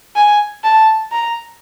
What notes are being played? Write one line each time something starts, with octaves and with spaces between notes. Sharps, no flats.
G#5
A5
A#5